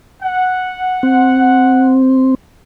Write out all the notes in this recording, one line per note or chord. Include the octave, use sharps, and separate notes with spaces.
F#5
C4